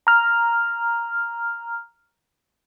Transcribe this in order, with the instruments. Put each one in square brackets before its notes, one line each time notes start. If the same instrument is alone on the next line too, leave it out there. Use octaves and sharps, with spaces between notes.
[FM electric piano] A#5 F6